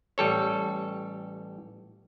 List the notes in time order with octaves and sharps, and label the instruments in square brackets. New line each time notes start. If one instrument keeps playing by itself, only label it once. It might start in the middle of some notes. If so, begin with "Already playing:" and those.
[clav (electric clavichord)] A1 G3 A4 C#5